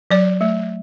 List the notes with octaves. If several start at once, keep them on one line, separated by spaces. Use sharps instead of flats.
F#3 D5
A3